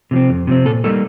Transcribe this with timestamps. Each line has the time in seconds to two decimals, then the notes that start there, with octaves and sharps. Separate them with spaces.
0.11 C3 F3 C4
0.30 F2
0.47 C3 F3 C4
0.65 A#2 A4
0.84 G3 A#3 D#4 A4